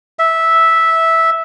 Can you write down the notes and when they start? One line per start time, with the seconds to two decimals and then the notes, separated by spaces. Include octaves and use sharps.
0.19 E5